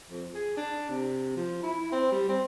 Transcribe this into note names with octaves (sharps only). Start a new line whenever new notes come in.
F2
G#4
D4
C3
F3
E4
C4
G3
C4